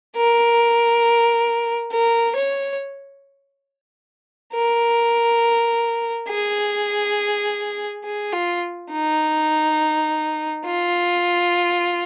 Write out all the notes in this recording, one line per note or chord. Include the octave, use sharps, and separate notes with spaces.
A#4
A#4
C#5
A#4
G#4
G#4
F4
D#4
F4